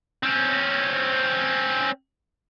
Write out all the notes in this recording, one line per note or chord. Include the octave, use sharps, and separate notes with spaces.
C4 C#4